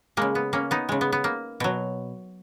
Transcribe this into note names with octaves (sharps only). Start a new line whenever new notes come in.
C#3 G#3 A#3
B3
A#3 C#4
B3 D#4
C#3 G#3
B3
B3
A#3
B2 F#3